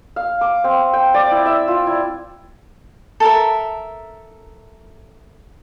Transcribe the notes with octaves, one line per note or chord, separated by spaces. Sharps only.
F5
D6
C4
G5
D5
E4
E5
F4
E4
A4 A#4 E5